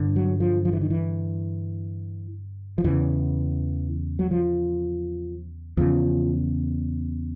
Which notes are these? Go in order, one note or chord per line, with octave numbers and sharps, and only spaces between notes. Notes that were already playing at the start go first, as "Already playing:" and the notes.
Already playing: G2 D3
F#3
F3
F3
E3
D#3
E3
F3
E2 C#3 E3
F#3
F3
E2 C#3 F3